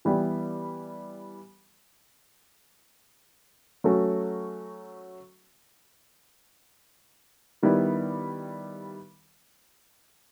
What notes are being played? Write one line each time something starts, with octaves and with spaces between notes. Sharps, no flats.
E3 G3 B3 E4 G4
F#3 A3 C#4 F#4
D#3 G3 B3 E4